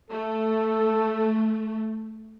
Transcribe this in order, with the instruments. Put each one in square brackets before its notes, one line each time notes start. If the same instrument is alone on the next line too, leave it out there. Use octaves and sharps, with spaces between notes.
[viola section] A3 [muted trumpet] A4